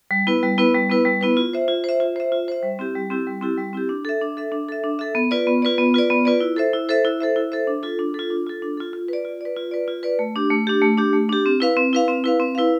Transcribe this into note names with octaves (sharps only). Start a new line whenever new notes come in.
G3
B3 E4 B4
G3
B3 E4 B4
G3
B3 E4 B4
G3
B3 E4 B4
F4
C5 E5
F4
C5 E5
F4
C5 E5
F4
C5 E5
G3
C4 E4 G4
G3
C4 E4 G4
G3
C4 E4 G4
G3
C4 E4 G4
D4
A4 E5
D4
A4 E5
D4
A4 E5
D4
A4 E5
B3
F4 B4 D5
B3
F4 B4 D5
B3
F4 B4 D5
B3
F4 B4 D5
E4
A4 C5 E5
E4
A4 C5 E5
E4
A4 C5 E5
E4
A4 C5 E5
D4
F4 A4
D4
F4 A4
D4
F4 A4
D4
F4 A4
F4
B4 D5
F4
B4 D5
F4
B4 D5
F4
B4 D5
A3
D4 G4
A3
D4 G4
A3
D4 G4
A3
D4 G4
C4
E4 B4 F5
C4
E4 B4 F5
C4
E4 B4 F5
C4
E4 B4 F5